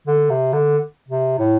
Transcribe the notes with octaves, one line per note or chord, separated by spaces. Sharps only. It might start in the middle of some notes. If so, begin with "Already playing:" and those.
D3
C3
D3
C3
A2